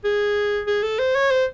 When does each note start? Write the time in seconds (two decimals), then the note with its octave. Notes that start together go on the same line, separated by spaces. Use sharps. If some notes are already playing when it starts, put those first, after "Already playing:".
0.04 G#4
0.67 G#4
0.83 A4
0.99 C5
1.15 C#5
1.31 C5